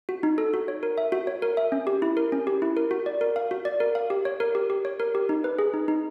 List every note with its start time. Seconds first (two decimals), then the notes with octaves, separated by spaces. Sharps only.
0.09 F#4
0.23 D#4
0.38 A4
0.54 F#4
0.68 C#5
0.83 A#4
0.98 E5
1.12 F#4
1.27 C#5
1.42 A#4
1.57 E5
1.72 C#4
1.87 G4
2.02 E4
2.17 A#4
2.32 C#4
2.47 G4
2.62 E4
2.77 A#4
2.91 F#4
3.06 D5
3.21 A#4
3.36 F5
3.51 F#4
3.65 D5
3.80 A#4
3.95 F5
4.10 G4
4.25 C#5
4.40 A#4
4.55 G4
4.70 G4
4.85 C#5
5.00 A#4
5.15 G4
5.29 D#4
5.44 B4
5.59 G#4
5.74 D#4
5.88 D#4